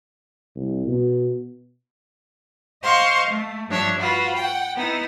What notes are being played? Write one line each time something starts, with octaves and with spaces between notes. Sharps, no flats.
C2
B2
C5 D#5 F5 C6 C#6
A3
G2 F3 D4 C#5 E5
F4 F#4 B4
F#5 G5
B3 D#4 E4